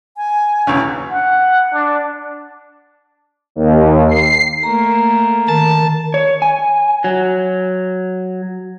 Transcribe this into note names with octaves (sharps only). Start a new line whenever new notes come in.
G#5
B1 E2 C#3
F#5
D4
D#2
C7
A3 A#3 A#5
D#3 A5
C#5
G#5
F#3